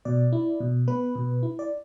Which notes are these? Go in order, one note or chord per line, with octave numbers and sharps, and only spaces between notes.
B2 D5
E4
B2
B3 B4
B2
E4
D5